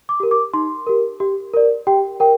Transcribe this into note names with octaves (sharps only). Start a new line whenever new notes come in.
D6
G4 A#4
D6
D#4 C6
G4 A#4
G4
A#4 D5
G4 G5
A#4 G5